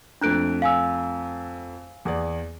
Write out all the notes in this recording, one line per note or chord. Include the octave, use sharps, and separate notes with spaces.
F2 A3 D4 A#5 F#6 D7
F5 G#5 E6
E2 G#4 D5